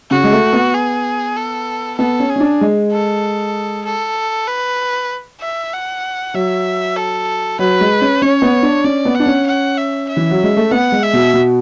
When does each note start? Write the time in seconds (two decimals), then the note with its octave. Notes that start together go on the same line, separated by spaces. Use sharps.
0.11 C#3 F#4
0.24 G#3
0.32 A3
0.53 B3
0.74 G#4
1.36 A4
1.98 B3 A4
2.20 C#4
2.29 G#4
2.36 C#4
2.40 D4
2.61 G#3
2.92 A4
3.85 A4
4.47 B4
5.41 E5
5.73 F#5
6.34 F#3 E5
6.97 A4
7.59 F#3 B4
7.81 G#3
8.01 C#4
8.22 C#4 C#5
8.42 B3
8.63 D4
8.84 C#4 D5
9.05 B3
9.15 D4 F#5
9.26 C#4
9.47 F#5
9.77 E5
10.09 E5
10.17 E3
10.31 F#3
10.44 G#3
10.57 A3
10.71 B3 F#5
10.92 G#3
11.03 E5
11.13 B2
11.34 B2